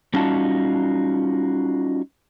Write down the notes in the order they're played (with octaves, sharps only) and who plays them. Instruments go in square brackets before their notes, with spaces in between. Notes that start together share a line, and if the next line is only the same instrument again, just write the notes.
[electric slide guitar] G3 C#4 D#4 F4 F#4 A5